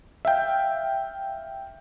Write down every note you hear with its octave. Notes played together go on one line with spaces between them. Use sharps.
E5 F5 G5